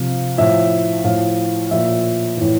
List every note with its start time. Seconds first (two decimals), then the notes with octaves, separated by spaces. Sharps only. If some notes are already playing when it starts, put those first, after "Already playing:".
Already playing: C3 F3 F5
0.38 A2 F3 E5
1.04 A2 F3 F5
1.71 A#2 F3 E5
2.37 A2 E3